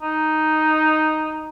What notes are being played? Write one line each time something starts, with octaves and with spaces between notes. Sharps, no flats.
D#4